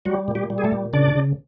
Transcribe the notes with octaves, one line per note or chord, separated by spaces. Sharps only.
F#3 G3 F#4
A#2
G3 G4
G3
G#4
A3 A4
A#2
C#3 D4 D5
C#3